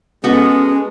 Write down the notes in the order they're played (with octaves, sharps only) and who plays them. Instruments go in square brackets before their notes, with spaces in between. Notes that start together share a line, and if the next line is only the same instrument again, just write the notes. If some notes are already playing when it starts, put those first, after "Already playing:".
[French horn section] G#3 [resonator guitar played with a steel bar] B3 F#4 A4 [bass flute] C#4